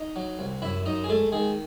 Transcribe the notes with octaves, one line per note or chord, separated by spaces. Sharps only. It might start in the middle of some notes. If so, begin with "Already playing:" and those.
Already playing: D#4 D#5
F#3
C2
F#2 E4 E5
F#2 D#4 D#5
G#4
G#3 A3 A4
D#3 G#3 G#4